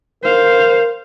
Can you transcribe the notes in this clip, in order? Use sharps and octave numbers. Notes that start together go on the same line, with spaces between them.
A#4 C5 F5